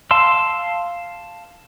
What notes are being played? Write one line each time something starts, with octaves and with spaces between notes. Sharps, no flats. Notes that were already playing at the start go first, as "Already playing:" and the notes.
F5 A5 C6 E6